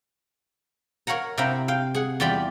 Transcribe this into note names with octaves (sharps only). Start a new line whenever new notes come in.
A#4 C#5 F5 F#5 A#5
C3 E4 F5 G5 A#5
F5 G5
G#4 F#5
E2 G3 F4 G4 D5 B5